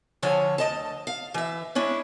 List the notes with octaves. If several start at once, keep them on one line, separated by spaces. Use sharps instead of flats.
D3 F3 F4 C#5 G#5
D2 D#5 A5
F5
E3 E5
G#3 C#4 D4 E4